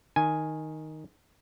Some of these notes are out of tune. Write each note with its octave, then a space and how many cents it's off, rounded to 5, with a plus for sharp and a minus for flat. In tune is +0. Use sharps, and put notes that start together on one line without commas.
D#3 +0 G#5 +0